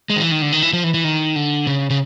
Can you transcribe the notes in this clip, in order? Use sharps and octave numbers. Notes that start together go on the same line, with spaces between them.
G#3
D#3
E3
D#3
D3
D#3
E3
F3
E3
E3
D#3
D3
C#3
C#3